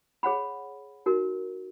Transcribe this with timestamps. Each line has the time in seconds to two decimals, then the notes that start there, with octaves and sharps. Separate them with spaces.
0.23 G#4 C#5 F#5 B5
1.06 D#4 F#4 A#4